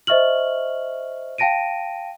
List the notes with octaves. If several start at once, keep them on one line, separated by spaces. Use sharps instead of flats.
C5 D#5 E5 C#6 F6 F#7
F5 G5 A5 A#6 D7 D#7